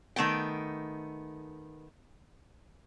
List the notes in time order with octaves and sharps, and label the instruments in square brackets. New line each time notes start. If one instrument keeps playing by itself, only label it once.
[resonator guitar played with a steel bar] D#3 A3 B3 G5